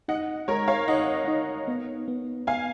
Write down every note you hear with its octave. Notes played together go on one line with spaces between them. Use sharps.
D#4 D#5 F#5
G#3 A#4 C#5
C#5 F5
D#4 D#5 F#5
D#4
B3
B3
B3 F5 G#5